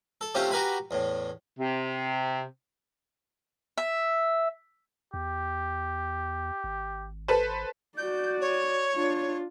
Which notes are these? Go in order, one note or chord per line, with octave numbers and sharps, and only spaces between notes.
A4
C3 A3 C4 C#4 F4 G4
F#4 G4 A#4 B4 G#5 B5
E2 A2
C3
E5
E2 G4
G#1
A4 B4 C5
F#4 D5 G6
C#5
D4 F4